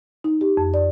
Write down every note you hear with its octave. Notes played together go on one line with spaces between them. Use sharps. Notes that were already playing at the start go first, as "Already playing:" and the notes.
D#4
G4
F2
D5